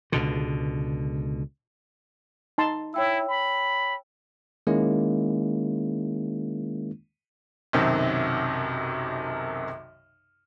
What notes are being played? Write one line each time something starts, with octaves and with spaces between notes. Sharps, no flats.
C#2 B2 D3
D#4 A5 C6
E4 C#5 G5 E6
B5
D#3 G#3 A#3 C#4 E4
B1 F#2 C3 D#3 F#3